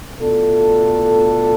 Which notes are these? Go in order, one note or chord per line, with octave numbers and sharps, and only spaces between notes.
B2 A3 D4 F4 A4